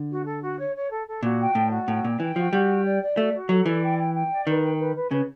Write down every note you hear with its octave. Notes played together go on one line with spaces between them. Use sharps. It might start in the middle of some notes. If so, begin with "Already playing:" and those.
Already playing: D3
F#4
A4
F#4
C#5
C#5
A4
A4
A#2 F#4
G5
A2 D5
F#4
A2 G5
A#2 G5
E3 G5
F3 F#4
G3 F#4
G5
D5
D5
A3 F#4
F#4
F#3 A4
E3 D5
G5
G5
G5
D5
D#3 B4
G5
B4
B4
C#3 B4